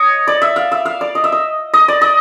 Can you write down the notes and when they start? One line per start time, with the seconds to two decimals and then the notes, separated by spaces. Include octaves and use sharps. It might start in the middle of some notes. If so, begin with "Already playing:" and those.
Already playing: C#5 D#5
0.27 D5
0.42 E5
0.56 F5
0.72 E5
0.85 F5
1.01 D5
1.15 D#5
1.24 E5
1.32 D#5
1.74 D#5
1.88 D5
2.01 D#5